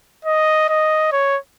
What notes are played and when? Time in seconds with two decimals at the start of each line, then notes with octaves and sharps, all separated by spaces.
0.25 D#5
0.69 D#5
1.12 C#5